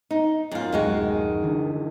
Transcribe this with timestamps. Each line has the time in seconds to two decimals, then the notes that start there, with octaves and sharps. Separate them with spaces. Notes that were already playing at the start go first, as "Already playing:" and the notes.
0.11 D#4
0.52 F#2 F4
0.72 D1 F#2 D#3 G#3 F#4
1.43 D3 E3